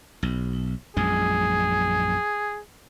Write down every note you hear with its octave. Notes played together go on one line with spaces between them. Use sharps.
B1
A#1 F#2 G#3 G#4